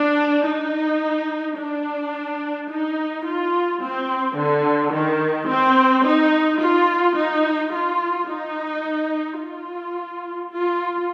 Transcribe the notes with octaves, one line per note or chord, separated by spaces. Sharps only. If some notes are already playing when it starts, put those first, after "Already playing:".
Already playing: D4
D#4
D4
D#4
F4
C4
D3
D#3
C4
D#4
F4
D#4
F4
D#4
F4
F4